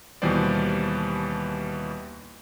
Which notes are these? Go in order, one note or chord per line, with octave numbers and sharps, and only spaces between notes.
D#2 B2 E3 G3 C5 D5